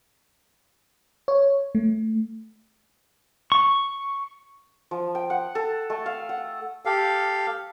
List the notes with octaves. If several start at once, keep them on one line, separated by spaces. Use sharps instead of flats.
C#5
A3
C#6
F3
G5
F#5
A4
A3
F5
F#5
G4 A4 F5